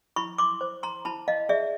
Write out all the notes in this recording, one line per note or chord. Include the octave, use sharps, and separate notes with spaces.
E4 B5 C#6
C6 D6
C5
A#5 C6
E4 A5 B5
D#5 F5
G#4 D5 E5